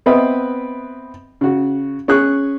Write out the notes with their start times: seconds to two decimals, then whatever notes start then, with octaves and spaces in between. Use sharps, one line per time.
0.06 B3 C4 B4 D#5 E5
1.41 C#3 F#4
2.08 C#4 G#4 C#6 F#6